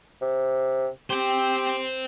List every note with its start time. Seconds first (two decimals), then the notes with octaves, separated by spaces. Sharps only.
0.21 C3
1.10 G4 C5 G5